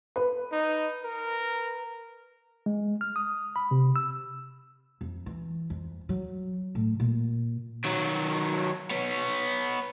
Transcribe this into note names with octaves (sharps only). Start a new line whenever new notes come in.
B4
D#4
A#4
G#3
F6
D#6
B5
C3
E6
F2
E3
F2
F#3
A2
A#2
D#3 F#3
B3 C#5